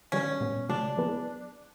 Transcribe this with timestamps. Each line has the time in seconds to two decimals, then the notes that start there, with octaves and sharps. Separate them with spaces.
0.12 D#3 G3 B3 C#4 D4
0.41 A#2 G3 B3
0.69 C#3 F#3 A3 D4
0.97 F#3 B3 E4 G#4 B4